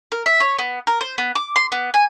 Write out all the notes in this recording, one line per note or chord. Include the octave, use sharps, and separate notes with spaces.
A#4
E5
C#5
B3
A#4
C5
B3
D6
C6
B3
G#5